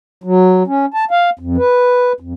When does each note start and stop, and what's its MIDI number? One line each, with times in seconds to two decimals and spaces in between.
0.24 0.63 54
0.67 0.86 61
0.94 1.05 81
1.11 1.30 77
1.39 1.57 41
1.57 2.13 71
2.20 2.33 41